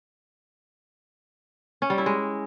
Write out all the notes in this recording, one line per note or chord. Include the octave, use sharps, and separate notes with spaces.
C#4
G3
E4
G#3